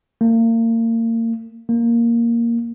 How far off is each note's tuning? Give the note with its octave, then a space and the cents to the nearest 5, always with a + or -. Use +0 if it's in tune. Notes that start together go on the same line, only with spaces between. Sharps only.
A#3 -35
A#3 +0